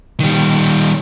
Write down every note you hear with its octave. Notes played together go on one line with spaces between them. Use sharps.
D#3 G3